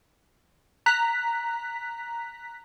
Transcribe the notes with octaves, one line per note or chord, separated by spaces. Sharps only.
A#5 F#6 B6